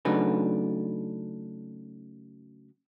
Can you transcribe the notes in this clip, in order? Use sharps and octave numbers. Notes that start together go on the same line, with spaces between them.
C#3 F#3 A3 D4 D#4 B4